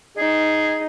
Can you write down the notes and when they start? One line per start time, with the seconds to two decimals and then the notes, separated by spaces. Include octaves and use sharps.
0.18 D#4 G#4